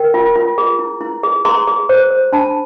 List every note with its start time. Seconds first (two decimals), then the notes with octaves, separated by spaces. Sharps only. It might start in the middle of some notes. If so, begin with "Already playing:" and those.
Already playing: A#4 G5
0.14 F4
0.36 F4
0.58 G#4
0.79 E4
1.01 E4
1.23 G#4
1.45 G#4 A#5 C6
1.67 G#4
1.89 C5
2.11 C5
2.32 D4 A5 B5